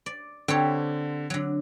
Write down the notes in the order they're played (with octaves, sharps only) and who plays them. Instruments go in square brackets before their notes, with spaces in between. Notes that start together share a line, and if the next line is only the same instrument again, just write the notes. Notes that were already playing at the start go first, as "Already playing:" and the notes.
[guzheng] D5
[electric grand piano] D3 [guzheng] C4 G4 C#5
[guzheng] D3 F#3